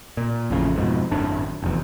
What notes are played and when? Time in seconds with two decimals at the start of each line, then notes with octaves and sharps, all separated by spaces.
0.17 A#2
0.50 A1 F2 A2 C#3
0.76 F2 G#2 B2
1.11 G#1 F#2 A2 D4
1.62 F1 E2